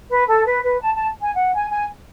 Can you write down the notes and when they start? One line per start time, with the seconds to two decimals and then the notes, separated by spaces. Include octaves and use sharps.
0.10 B4
0.27 A4
0.45 B4
0.64 B4
0.81 A5
0.94 A5
1.21 G#5
1.35 F#5
1.53 G#5
1.70 G#5